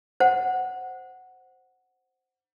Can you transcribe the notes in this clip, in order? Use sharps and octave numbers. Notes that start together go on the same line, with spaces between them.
C5 F#5